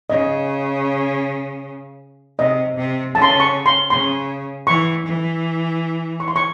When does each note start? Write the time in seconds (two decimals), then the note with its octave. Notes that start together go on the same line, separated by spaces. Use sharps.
0.10 C#3 D#5
2.39 C3 D#5
2.77 C3
3.15 C#3 A5
3.22 C6
3.29 A5
3.40 C#6
3.66 C6
3.90 C#3 C6
4.67 E3 C#6
5.05 E3
6.20 C#6
6.28 C6
6.36 C#6